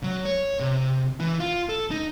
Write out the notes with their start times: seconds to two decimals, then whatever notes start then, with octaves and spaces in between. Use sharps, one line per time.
0.04 F#3
0.25 C#5
0.60 C3
1.20 E3
1.40 F4
1.69 A4
1.91 D#4